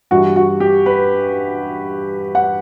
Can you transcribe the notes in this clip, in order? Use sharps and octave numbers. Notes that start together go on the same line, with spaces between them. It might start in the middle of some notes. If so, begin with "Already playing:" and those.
G2 E3 G3 F#4
F#4
G4
B4
F#5